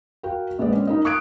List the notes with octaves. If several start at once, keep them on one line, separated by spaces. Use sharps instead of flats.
F#4 A#4 F5 G5
A#1 A#2 G#3 B3 D5
C#4
D#4 A#4 D#5
C#6 D#6 F#6 G#6 D7